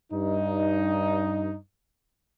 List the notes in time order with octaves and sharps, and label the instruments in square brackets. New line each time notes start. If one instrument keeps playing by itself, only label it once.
[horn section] G2 D#4